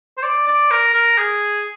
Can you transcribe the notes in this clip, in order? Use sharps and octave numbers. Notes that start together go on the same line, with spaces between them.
C5
D5
D5
A#4
A#4
G#4